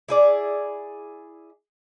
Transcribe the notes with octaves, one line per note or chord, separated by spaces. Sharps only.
E4 G#4 D5